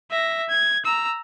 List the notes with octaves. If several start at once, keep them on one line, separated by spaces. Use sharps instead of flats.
E5 A#6
G#6
A#5 E6